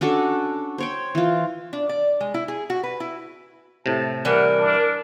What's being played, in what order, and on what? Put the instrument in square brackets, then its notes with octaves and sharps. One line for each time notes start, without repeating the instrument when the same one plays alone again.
[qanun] C#4 D4 F#4 A4
C5 C#5 G5
E3 F4
[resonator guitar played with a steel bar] D4
D5
G#3
E4
G#4
F#4
B4
E4
[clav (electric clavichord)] A2 C3 [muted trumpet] A5
[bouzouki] E3 G3 [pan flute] A#4 [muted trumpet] F#5
[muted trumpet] D4